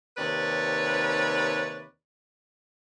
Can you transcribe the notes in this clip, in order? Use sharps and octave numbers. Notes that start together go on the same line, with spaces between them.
D#2 C3 B4 C#5 D5